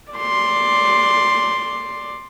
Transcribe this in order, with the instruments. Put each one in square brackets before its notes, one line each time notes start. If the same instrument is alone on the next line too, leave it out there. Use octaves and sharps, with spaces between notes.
[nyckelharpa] D5 C6